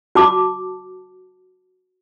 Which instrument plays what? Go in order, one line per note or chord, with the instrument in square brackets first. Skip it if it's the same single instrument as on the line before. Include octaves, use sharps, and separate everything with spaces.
[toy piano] F#4 A5 D6